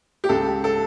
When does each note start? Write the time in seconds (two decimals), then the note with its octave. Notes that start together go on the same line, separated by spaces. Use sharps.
0.24 G4
0.29 C#2 A4
0.64 A4